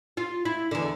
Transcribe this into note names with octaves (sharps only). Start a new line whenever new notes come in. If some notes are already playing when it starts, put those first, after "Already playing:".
F4
E4
E2 D3